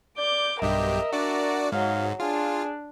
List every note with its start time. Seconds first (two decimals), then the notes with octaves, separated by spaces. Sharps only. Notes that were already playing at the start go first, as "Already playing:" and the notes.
0.18 D5 D6 G6
0.62 B1 G2 G4 A#4 D#5 E5
1.12 D4 F#4 D5
1.72 G#2 F#3 F5
2.20 D4 F4 G#4